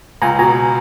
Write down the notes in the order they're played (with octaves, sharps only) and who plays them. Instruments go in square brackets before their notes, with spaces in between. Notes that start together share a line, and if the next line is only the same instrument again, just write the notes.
[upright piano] C#2 [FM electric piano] G#5 A#5
[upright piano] B2 [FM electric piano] G#5 A#5